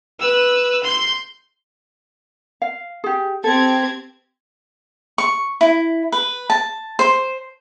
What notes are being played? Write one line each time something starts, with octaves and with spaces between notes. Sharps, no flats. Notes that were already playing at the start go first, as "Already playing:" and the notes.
B4 E6
C6 G6
F5
G4 G#4
C4 G4 A4 G#6
C#6
E4
B4
A5
C5